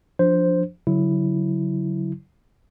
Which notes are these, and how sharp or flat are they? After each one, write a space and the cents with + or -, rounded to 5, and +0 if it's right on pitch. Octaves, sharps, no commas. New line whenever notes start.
F3 +10 D4 +0 C5 +0
D3 -45 F#3 +0 E4 +0